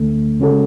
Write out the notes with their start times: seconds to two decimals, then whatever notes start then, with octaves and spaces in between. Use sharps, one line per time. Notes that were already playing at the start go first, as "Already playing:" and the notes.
Already playing: D2 D3 A3
0.40 C#3 G#3 C#4 F#4 A4